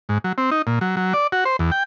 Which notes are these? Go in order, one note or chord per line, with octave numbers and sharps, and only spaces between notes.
G#2
F#3
C4
D#4
A#2
F#3
F#3
D5
F#4
C5
E2
G5